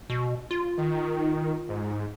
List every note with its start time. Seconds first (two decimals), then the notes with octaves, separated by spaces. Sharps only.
0.10 B2
0.51 F4
0.77 D#3
1.69 G#2